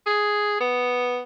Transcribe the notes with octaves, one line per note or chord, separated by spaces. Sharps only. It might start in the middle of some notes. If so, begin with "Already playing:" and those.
G#4
B3